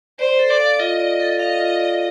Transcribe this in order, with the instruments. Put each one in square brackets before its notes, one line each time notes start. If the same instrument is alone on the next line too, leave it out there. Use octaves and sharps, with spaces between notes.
[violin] C5 [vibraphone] D5
[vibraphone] A4
[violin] D5
[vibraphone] F5
[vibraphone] F4 [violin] D#5
[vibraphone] D5
A4
[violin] D#5 [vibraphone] F5
[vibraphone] F4
D5